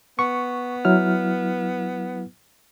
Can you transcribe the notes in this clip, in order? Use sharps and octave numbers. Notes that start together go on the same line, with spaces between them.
B3 C#6
F#3 E4 F6